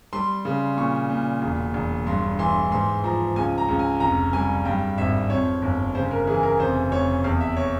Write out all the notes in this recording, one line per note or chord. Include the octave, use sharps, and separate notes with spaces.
G3 C6
C#3
A#2 C#6
A#2
E1
E1
G2 C6
E3 C6
G#2 C6
F3 A#5
C#2 G#5
A#5
C#2
G#5
F1 A#5
G3 G#5
G2 G5
G#1 E5
F2 C#5
G1
C#3 C5
A#4
E3 G#4
A#4
F1 C5
F1 C#5
E2 F5
E5
C#5